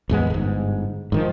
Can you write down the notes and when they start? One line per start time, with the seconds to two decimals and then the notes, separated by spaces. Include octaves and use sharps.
0.09 A1 E2 G#3 B3
0.30 G1 G#2
1.12 G#2 D#3 F3